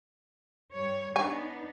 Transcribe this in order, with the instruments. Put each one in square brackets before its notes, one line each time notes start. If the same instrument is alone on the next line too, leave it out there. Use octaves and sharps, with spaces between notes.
[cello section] G2 G3 C#5
[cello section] B3 D4 D#4 [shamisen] C#5 G#5